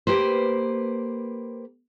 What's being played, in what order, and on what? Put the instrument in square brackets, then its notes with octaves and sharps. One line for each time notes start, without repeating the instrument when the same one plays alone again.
[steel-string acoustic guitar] A#3 G4 B4 C5